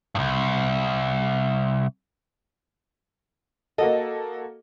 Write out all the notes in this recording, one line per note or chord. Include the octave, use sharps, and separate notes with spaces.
C2 G2
A#3 F#4 A4 D#5